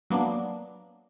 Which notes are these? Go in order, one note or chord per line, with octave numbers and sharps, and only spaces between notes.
F#3 A#3 B3 D4